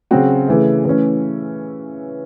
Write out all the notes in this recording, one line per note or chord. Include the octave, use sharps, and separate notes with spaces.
C#3 F#3 C4 F#4
C#3 E3 A3
E3 A3 C#4